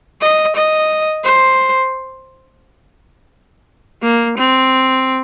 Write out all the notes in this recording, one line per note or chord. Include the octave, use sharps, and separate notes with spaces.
D#5
D#5
C5
A#3
C4